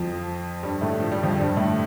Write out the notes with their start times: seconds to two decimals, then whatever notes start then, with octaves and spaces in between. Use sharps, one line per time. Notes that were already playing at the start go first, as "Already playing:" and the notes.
Already playing: F2 F3
0.63 G2 G3
0.81 A2 A3
1.00 F3
1.12 G3
1.23 F2 F3
1.38 G2 G3
1.57 A2 A3